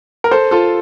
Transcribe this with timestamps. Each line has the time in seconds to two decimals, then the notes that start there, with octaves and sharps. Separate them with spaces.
0.24 A#4
0.31 A4 C5
0.51 F4 A4